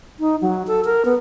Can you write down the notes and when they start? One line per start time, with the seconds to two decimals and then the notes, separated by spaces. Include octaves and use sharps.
0.20 D#4
0.41 F#3
0.67 A4
0.85 A#4
1.05 B3